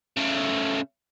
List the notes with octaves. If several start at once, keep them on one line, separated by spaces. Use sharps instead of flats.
C#3 A3